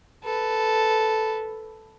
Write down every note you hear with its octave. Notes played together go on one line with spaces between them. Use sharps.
A4 B4